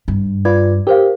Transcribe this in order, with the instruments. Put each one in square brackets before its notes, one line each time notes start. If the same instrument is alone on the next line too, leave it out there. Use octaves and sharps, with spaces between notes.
[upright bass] G2
[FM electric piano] F4 B4 D5 [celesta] G#6
[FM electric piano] G4 [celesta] A#4 C5 F5